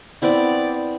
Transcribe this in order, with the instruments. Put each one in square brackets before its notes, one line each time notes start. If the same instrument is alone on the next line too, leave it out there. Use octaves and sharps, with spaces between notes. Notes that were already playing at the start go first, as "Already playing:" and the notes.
[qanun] B3 C4 E4 [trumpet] D5